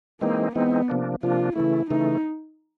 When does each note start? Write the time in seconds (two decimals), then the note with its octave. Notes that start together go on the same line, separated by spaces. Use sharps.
0.21 E3 G#3 A#3 C4 D#4
0.55 E3 G#3 B3 C4 D#4
0.88 C3 F3 A#3 D4
1.23 C3 F3 A#3 D4 F4
1.56 C#3 E3 A3 E4
1.90 C#3 E3 A3 D#4